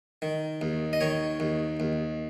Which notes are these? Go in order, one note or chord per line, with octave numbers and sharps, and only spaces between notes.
D#3
D#2
D#5
D#3 C#5
D#2
D#2